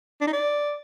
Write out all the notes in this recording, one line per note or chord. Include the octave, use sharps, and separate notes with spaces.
D4
D#4
D5